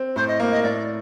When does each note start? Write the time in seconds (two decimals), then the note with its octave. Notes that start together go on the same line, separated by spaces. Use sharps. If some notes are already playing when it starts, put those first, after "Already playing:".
Already playing: C4
0.16 A2 C5
0.28 D#5
0.40 A#3
0.52 D#5
0.63 A2 D5